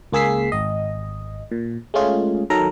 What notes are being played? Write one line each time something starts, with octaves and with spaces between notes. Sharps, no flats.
C#2 A#3 G#4 E6 B6 C7
G#1 D#5
A#2
G#3 A3 C#4 F4 G#4
D#3 F#3 A4 A#4 A#5